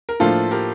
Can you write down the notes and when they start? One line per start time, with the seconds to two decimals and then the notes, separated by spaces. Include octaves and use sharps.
0.09 A#4
0.20 A2 F3 A#3 D4 F4 A4
0.51 G4 A#4